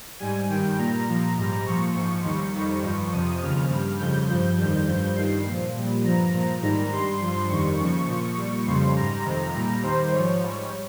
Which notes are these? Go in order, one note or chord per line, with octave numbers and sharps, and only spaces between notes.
G#2 G3 G#5
G2 D#3 G3 G5
A#2 G3 A#5
A#2 F3
G#2 G3
A#2 F3 C#6
G#2 F3
D#2 D#3 G3 C#6
F2 D#3 G3
G2 F3
F2 C3 F3 D#6
D#2 C#3 F3 F6
G2 G3
F2 C#3 G3 G6
G2 F3
F2 D#3 G3
G2 F3
G2 D#3 G3 C7
A#2 F3
A#2 G3
G2 F3 A#5
A#2 F3
G#2 D#3 G3 A#5
G2 G3 C6
G2 F3
F2 D#3 G3 C#6
D#2 C#3 F3 C#6
A#2 F3
A#2 G3
F2 C#3 G3 C6
G#2 G3 A#5
F2 C3 D#3
A#2 G3
D#2 D#3 G3 C5
G#2 F3 C#5
G#2 G3